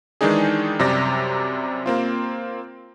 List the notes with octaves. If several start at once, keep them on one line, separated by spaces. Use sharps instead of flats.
D#3 E3 G#3 D4 D#4 G#4
F#2 C3 G3 G4 D5 A#6
A#3 C4 F4